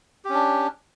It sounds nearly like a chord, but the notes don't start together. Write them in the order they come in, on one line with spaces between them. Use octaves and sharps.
G4 C#4 D4